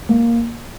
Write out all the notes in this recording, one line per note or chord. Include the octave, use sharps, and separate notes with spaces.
A#3